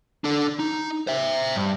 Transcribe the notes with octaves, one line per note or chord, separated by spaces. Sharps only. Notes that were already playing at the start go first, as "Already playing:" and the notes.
D4 A4
D#4
C5 E5
G2